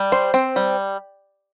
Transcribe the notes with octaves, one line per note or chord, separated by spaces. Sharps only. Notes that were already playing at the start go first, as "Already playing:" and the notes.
Already playing: G3
C5
C4
G3